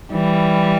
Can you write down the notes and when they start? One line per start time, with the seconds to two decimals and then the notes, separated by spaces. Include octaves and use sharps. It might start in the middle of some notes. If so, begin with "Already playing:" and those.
0.12 E3 G3